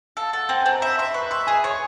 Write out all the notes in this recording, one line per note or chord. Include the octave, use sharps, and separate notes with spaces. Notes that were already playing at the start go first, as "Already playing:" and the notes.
A4 F5
A4 F#5
C4 G5
G#5
C4
A#5
E5 B5
E5 C6
B4 C#6
E5 C6
G#4 G#5
C#5 C#6